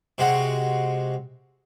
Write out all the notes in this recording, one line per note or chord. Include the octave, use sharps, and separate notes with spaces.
C3 G#3 F#4